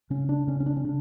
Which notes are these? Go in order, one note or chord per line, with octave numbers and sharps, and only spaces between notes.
C#3 C#4
D4
C#3 C#4
C#4
D4
C#4
C#3 D4